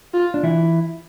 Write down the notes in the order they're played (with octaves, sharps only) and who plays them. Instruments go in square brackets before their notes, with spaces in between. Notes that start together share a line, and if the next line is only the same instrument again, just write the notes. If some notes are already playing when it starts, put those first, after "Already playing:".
[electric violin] F4
[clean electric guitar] D4
E3 E4